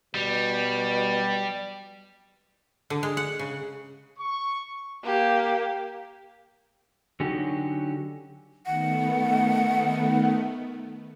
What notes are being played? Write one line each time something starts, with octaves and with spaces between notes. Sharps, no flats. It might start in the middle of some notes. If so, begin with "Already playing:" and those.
B2 G3
D3
G#3
F#5
C#3
C#6
A#3 G4
D3 F#3 C#4 D#4 F#4 G4
D#3 A3 B3 F#5